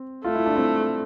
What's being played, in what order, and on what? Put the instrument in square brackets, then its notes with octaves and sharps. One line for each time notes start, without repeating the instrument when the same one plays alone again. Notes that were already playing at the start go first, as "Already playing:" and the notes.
Already playing: [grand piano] C4
[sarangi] A3 [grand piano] F4
[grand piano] E4
D4
C4 E4